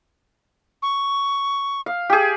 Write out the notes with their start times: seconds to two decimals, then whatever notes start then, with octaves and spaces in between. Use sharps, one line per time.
0.82 C#6
1.86 F5
2.10 G4 G#4